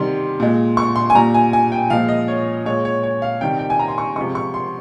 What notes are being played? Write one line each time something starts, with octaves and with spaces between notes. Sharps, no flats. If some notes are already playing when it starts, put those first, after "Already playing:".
Already playing: C3 D#3 G3 C6
A#2 G#3
C#6
C6
G#5
A#2 G3 A#5
G#5
G#5
G5
A#2 F3 G#3 F5
D#5
C#5
A#2 G#3 C#5
C#5
C#5
F5
C3 D#3 G3 G5
G5
G#5
A#5
C6
C#6
C3 F3 G#3 C#6
C#6
C6